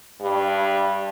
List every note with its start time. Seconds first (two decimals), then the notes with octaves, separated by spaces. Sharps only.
0.21 G2